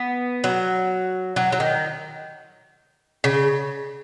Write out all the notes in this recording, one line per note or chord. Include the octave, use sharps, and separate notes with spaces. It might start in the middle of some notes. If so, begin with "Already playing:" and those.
Already playing: B3
F#3
F#3
F#3
D#3
C#3